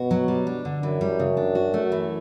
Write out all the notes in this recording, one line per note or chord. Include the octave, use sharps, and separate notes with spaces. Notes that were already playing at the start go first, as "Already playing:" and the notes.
Already playing: B2 F#4
F#3
G3
D4
D3
F#2 E3
G3
C#3
D4
F#4
A3
E3